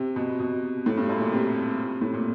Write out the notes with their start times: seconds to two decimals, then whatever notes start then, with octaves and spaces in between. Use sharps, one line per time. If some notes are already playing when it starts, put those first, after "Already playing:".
Already playing: C3
0.16 B2
0.40 B2
0.86 A2
0.97 G2
1.09 F#2
1.21 A#2
1.32 C3
2.01 A2
2.13 A#2